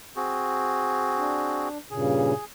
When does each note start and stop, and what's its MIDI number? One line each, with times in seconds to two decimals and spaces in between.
0.16 1.69 60
0.16 1.69 66
0.16 1.69 68
1.18 1.78 62
1.91 2.33 43
1.91 2.33 46
1.91 2.33 49
1.91 2.45 68